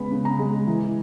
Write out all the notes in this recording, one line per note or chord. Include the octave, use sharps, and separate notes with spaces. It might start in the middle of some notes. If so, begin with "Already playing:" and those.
Already playing: C#3 G#3 B3 B5
C#3
A#5
G#3
E3